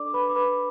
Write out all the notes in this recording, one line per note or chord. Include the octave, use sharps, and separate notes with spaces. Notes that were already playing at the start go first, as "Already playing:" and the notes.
Already playing: D4 A4 D5 D6
B4 B5
D6
B4 B5